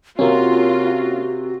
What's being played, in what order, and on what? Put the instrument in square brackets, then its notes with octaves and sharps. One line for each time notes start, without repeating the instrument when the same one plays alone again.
[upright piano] C3 [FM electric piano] A#3 C#4 [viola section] F4 [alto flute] F#4